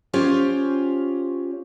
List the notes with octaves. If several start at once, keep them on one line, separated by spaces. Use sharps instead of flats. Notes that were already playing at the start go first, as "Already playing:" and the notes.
C#4 F4 G4 C5 C#5 F5